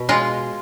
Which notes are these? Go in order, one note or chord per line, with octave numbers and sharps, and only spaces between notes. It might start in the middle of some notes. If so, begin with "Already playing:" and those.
Already playing: B2
G#3 F4